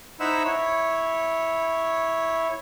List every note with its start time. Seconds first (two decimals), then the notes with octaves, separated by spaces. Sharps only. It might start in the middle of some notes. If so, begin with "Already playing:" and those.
0.20 D#4 E4 C5 E5 F#5 E6
0.44 E4 C#5